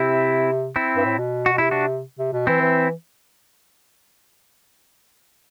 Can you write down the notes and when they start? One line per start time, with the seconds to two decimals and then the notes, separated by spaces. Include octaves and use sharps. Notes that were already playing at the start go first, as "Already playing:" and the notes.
Already playing: C3 C4 E4
0.76 C4 E4
0.96 G2
1.05 A2
1.18 B2
1.46 F#4
1.53 B2
1.58 C3 E4
1.71 D4 F#4
2.19 C3
2.33 B2
2.47 E3 C4 E4
2.61 E3